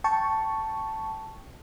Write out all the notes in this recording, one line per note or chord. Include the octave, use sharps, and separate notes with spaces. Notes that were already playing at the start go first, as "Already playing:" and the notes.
G5 A5 C#6